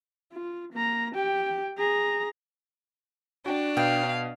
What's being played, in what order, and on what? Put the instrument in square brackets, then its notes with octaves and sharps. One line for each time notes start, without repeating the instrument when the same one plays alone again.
[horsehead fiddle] F4
A#3 A#5
G4 G5
G#4 A#5
[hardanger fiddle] D4 [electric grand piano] F#4 G5
[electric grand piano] B2 B3 [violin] F5 [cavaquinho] G5